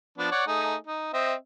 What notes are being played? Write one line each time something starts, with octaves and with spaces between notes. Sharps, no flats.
F3 B3 D4
C#5 D5 F#5
A3 D#4 G#4
D#4
C4 D#5 E5